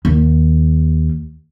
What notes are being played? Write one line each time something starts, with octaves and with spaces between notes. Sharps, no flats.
D#2